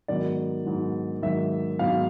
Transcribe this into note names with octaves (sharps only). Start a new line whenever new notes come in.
G#2 D#3 F#3 B3 D5
G#2 D#3 F#3 B3
G#2 D#3 F#3 B3 E5
G#2 D#3 F#3 B3 F5